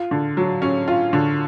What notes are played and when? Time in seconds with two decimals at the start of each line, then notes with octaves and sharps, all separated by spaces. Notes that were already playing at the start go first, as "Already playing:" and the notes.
Already playing: F4
0.11 D3
0.37 F#3
0.62 C#4
0.88 F4
1.13 D3